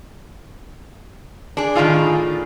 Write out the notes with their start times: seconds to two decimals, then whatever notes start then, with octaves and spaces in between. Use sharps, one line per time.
1.57 D4 G#4
1.76 A2 D#3 G3 D4 F4 G#4